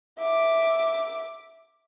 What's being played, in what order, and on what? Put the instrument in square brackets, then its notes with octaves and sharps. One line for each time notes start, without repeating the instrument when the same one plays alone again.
[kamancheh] E5 D6